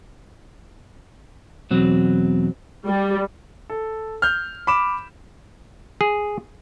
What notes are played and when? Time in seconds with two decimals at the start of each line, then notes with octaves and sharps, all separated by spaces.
1.71 E2 B2 F#3 C4
2.87 G3
3.70 A4
4.22 F6 G6
4.67 B5 D6 E7
6.01 G#4